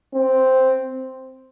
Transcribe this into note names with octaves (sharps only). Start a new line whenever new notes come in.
C4